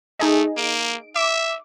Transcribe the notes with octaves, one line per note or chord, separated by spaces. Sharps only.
A3 D#4 G#4 D#5
A#3 D7
E5 D6